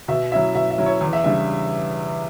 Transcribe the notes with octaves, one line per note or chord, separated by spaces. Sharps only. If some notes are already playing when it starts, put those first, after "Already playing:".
B2 E5
F#3 C#4 E4 E5
B2 E5
E5
F#3 C#4 E4
C#5
E2
E5
C#3 G3 D4 E5